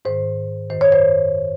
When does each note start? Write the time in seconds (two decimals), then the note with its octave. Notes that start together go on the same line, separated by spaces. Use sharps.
0.05 G#2 D#3 C5
0.70 F#2 D#3 C5
0.81 C#5
0.92 C5